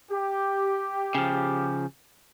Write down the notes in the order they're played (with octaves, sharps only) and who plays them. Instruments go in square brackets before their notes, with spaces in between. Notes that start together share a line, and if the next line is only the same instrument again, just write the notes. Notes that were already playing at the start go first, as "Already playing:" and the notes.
[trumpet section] G4
[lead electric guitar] C#3 F3